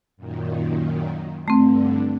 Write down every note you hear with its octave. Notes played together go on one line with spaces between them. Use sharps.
F#2 A#2 D#3
G2 D3 A3 C4